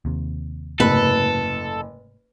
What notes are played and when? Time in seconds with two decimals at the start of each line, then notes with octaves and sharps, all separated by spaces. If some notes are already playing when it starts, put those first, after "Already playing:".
0.05 D#2 C3
0.80 F#1 G#2 C3 A3 A4 B4